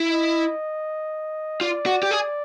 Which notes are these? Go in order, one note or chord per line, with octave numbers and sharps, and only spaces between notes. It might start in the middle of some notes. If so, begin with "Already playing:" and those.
Already playing: E4
D#5
F4 D5
F#4
G4
G#4